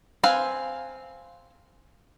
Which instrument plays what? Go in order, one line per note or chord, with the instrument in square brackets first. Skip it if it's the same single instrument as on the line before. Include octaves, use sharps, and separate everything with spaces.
[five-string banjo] C4 B4 F5 G#5